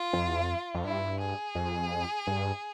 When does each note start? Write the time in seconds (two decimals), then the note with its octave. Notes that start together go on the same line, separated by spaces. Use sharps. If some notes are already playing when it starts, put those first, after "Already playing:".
Already playing: F4
0.13 F2
0.28 E2
0.37 F2
0.74 F2
0.84 G2 E4
1.20 G#4
1.55 F2
2.27 G2